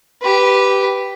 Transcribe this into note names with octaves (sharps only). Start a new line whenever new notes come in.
G4 B4